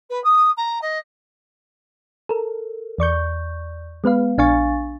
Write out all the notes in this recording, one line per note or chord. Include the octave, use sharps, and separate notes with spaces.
B4
D#6
A#5
D#5
A4 A#4
E2 D5 C#6 G6
G#3 B3 B4 F5
A#1 D4 F5 G#5 C#6 A6